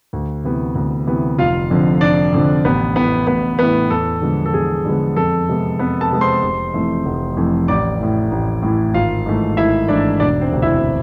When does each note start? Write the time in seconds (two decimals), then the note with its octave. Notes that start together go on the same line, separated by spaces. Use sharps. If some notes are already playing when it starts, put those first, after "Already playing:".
0.13 D2
0.44 C3 E3 B3
0.75 D2
1.07 C3 E3 B3
1.38 F1 F4 F5
1.70 F2 D3 F3
2.01 F1 D4 D5
2.33 F2 D3 F3
2.65 A1 B3 B4
2.96 A2 E3 B3 B4
3.27 A1 B3 B4
3.59 A2 E3 B3 B4
3.90 E2 A4
4.21 D3 F3 G#3 B3
4.46 A4
4.54 E2 G#4
4.85 D3 F3 G#3 B3
5.16 F2 A4
5.49 C3 G#3 B3
5.79 F2 B3 B4
6.01 A4 A5
6.11 C3 G#3 B3
6.21 C5 C6
6.43 F1
6.74 F2 E3 A3
7.05 F1
7.37 F2 E3 A3
7.68 A1 D5 D6
8.00 A2 E3
8.31 A1
8.63 A2 E3
8.94 G#1 F4 F5
9.26 G#2 E3 A3
9.57 G#1 E4 E5
9.88 G#2 E3 A3 D4 D5
10.20 E1 D4 D5
10.41 C4 C5
10.52 D2 C3
10.62 E4 E5